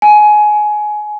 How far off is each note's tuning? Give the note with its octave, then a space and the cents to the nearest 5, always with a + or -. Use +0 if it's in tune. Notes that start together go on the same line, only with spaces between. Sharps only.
G#5 +20